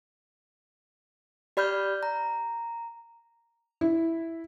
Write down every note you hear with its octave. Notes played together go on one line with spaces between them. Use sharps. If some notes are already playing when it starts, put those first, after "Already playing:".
G4 D5 B5 F6 G6
A#5
E4